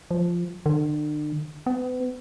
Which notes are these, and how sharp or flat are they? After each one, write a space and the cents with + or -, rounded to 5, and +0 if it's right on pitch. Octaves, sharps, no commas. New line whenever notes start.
F3 -5
D3 +40
B3 +35